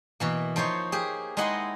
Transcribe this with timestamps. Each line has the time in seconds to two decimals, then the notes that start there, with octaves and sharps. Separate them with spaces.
0.20 B2 E3 A#3
0.56 F3 D#4 C5 C#5
0.92 A#3 G4 G#4
1.37 G#3 D#4 E4 D#5 F#5 C6